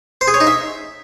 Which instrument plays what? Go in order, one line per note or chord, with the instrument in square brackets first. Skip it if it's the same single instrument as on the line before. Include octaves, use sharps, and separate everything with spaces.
[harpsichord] C5
G#4
C#5
D#4
E5